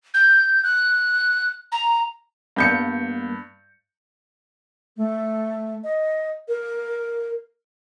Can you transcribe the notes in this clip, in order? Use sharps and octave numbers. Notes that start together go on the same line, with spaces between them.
G6
F#6
A#5
G2 G3 A#3 B3 G6 C#7
A3
D#5
A#4